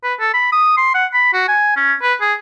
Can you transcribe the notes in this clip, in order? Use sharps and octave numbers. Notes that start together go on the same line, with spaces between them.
B4
A4
B5
D#6
C6
F#5
B5
F#4
G#5
C#4
B4
G#4